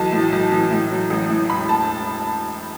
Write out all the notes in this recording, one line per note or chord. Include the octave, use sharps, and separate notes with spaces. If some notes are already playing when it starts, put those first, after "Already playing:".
Already playing: B1 E3 A5
A2
B1
E3
A2
F#3
A1
A2
E1 B5
A5